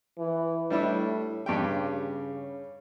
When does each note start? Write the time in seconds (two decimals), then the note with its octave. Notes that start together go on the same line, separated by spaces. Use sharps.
0.18 E3
0.70 A2 G3 D4 E4
1.46 G2 C#3 G4 G5